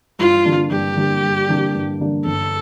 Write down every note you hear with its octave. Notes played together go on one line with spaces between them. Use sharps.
G2 F4
D3 G3 A#3 D4
G2 G4
D3 G3 A#3 D4
G2
D3 G3 A#3 D4
G2
D3 G3 A#3 D4
G1 A4